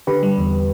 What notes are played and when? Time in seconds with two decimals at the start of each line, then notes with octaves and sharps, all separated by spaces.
0.07 D3 G4 B4
0.23 G3
0.37 E2